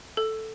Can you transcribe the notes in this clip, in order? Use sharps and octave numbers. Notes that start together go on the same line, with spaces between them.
A4